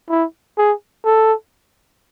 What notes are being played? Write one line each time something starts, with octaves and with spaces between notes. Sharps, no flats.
E4
G#4
A4